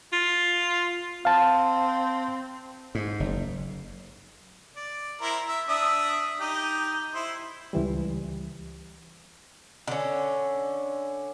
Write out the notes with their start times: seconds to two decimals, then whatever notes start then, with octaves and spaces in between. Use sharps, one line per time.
0.13 F4
1.25 C4 F5 A5
2.95 G#2
3.20 F#1
4.76 D5
5.22 E4 A#4 C5
5.48 E5
5.69 D4 E5 D#6
6.40 D#4 G4
7.14 E4 C5
7.73 C#2 E3 G3
9.87 D3 C#4